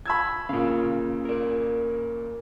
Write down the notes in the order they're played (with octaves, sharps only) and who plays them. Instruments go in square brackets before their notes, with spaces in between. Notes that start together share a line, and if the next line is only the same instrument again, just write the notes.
[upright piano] B5 E6 G#6
[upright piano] A#2 C#3 [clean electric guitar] C#4 F5
[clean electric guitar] A#4 D5